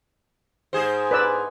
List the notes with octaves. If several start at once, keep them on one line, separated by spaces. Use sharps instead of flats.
G#2 G#4 C5
B4 D5 E6